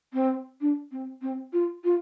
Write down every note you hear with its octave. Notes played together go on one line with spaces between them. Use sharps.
C4
D4
C4
C4
F4
F4